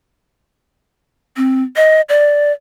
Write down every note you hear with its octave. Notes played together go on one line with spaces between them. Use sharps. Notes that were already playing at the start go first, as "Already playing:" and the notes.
C4
D#5
D5